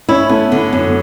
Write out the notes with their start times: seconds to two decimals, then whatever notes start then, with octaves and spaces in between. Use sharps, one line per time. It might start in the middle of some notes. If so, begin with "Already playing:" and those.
0.09 C#4 E4
0.29 A3 B3
0.52 D3 B3
0.72 F#2 B3